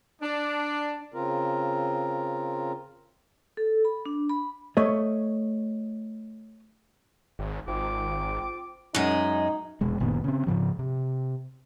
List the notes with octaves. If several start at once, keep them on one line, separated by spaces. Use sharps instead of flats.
D4
C#3 C4 F4 A#4
A4
B5
D4
B5
A3 C#5 D#5
G#1
G#1 C4 F4 D6
F#2 G#3 D#4
F1 B2 G#3
F#1 A#2 D#3 B3
C#3 C4
G#2 C#3 F3
C3